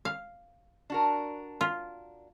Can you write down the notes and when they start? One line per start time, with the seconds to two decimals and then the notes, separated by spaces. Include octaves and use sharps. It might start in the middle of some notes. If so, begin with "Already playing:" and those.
0.05 F5
0.90 D4 F#4 A#4
1.61 F4